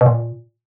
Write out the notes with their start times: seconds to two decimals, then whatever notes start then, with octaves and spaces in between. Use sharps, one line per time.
0.01 B2
0.06 A#2